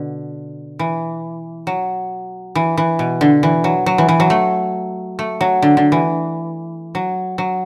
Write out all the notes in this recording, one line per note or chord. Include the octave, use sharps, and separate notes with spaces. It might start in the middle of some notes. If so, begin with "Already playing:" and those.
Already playing: B2 D3
E3
F#3
E3
E3
B2
D3
E3
F#3
F#3
E3
E3
F#3
A3
A3
F#3
D3
D3
E3
F#3
F#3